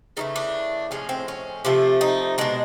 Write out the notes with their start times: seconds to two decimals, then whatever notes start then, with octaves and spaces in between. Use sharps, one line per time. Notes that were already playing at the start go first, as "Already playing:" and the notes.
0.17 C#3 E3 A3 D#4
0.36 D4
0.91 A2 F3 G#3 C#4
1.09 C4
1.28 C#4
1.65 C3 F3 A3
2.01 D#4
2.38 B2 G#3 D4